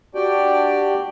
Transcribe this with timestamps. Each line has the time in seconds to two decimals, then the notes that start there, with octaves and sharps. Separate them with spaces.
0.15 D4 F#4 G4 D5 G5